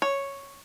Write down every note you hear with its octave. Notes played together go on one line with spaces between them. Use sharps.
C#5